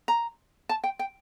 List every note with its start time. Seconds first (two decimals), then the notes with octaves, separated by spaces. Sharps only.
0.08 A#5
0.69 A5
0.84 G5
0.99 G5